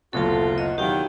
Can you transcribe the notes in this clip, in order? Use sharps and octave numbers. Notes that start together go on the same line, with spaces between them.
F#1 D2 B2 F4 F#4 A4 A5
D#5
E2 B2 D#3 F#3 G4 F5 G5